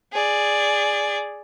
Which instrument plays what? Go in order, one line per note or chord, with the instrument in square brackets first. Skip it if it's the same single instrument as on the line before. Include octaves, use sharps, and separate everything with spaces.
[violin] G#4 D5